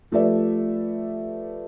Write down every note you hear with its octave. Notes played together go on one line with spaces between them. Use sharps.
F3 A3 G4 B4 D5 E5